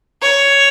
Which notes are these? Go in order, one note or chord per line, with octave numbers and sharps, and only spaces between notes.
C#5